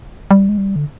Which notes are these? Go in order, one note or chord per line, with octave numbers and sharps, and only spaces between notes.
G3
G#3
G3
D3